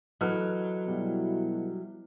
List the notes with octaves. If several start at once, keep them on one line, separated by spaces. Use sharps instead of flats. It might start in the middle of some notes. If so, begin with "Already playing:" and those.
E3 F#3 A4 B4 D#5 F6 F#6
B2 G3 E4